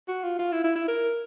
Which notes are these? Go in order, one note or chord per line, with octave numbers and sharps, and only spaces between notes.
F#4
F4
F4
E4
E4
E4
A#4